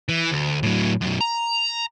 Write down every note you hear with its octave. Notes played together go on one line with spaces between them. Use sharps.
E3
D2
A2 F#3
F#2 B2
A#5